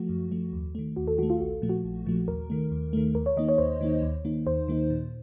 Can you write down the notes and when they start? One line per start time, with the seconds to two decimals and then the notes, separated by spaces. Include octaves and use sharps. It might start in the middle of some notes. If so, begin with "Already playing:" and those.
Already playing: F3 A3 F#4
0.09 F#2
0.32 F3 A3
0.53 D#2
0.75 D#3 A3
0.96 D#2 F#4
1.08 A4
1.18 D#3 A3 F#4
1.30 F4
1.40 A#1 F#4
1.62 A#2 F3 A3
1.69 F#4
1.84 A#1
2.06 A#2 F3 A3
2.28 D#2 A#4
2.50 D#3 A3
2.71 D#2
2.93 D#3 A3
3.15 D#2 A#4
3.26 C#5
3.36 D#3 A#3 D#4 D#5
3.49 C#5
3.58 D#2 C5
3.81 D#3 A#3 D#4
4.02 D#2
4.25 D#3 A#3 D#4
4.46 D#2 C5
4.68 D#3 A#3 D#4
4.90 A#2